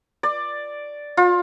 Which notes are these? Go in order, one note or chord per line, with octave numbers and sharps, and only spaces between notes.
D5
F4